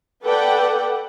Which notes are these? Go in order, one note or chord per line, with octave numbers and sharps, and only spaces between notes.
A4 B4 D5 F#5 G5